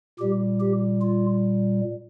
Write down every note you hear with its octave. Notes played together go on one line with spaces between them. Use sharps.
A#2 G3 G4
G4
F4